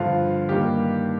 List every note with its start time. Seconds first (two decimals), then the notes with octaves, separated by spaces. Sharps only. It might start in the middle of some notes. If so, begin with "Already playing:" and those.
Already playing: G2 D3 F3 F4
0.49 G2 D#3 G3 A#3 G4